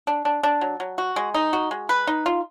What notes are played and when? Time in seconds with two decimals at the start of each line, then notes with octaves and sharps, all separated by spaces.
0.07 D4
0.25 D4
0.43 D4
0.61 F#3
0.80 F#3
0.98 F#4
1.16 G#3
1.34 D#4
1.53 F#4
1.71 G#3
1.89 B4
2.07 D#4
2.26 F4